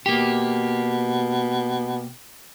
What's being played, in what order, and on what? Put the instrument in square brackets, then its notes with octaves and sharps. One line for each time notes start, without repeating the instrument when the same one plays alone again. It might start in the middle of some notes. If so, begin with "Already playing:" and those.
[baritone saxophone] B2 [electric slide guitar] A#3 G4